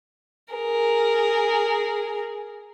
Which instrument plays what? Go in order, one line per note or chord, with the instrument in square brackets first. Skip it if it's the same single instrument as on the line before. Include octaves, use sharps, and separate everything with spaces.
[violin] G#4 A#4